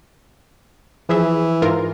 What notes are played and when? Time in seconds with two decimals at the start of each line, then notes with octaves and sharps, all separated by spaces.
1.09 E3 F3 G#4 E5
1.62 G#2 F4 A#4